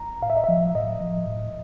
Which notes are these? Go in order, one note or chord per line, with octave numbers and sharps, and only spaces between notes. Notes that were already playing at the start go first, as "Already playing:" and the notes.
Already playing: A#5
A2 F5
E5
D#5
F3 E5
A2 D#5
F3
A2